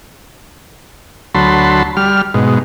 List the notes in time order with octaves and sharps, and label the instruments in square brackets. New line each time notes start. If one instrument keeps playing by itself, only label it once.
[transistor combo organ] D2 F#3 A5 B5 C6
G3 F6
G#2 B2